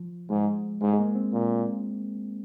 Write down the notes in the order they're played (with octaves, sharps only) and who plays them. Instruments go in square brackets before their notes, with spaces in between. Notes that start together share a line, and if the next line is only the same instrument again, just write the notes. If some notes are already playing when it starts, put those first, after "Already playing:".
Already playing: [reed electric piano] F3
[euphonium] G#2 [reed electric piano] G#3
[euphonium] G#2 [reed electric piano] G#3
[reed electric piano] G#3
A#3
C4
[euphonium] A#2